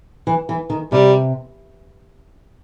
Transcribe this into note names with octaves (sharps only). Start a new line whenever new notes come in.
E3
E3
D#3
C3 G3